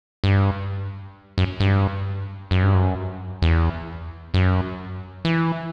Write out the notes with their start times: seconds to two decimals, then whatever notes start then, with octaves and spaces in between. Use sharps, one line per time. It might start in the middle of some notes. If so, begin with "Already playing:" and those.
0.24 G2
1.38 F#2
1.60 G2
2.51 F#2
2.63 G2
2.74 F#2
3.42 E2
4.34 F#2
5.25 E3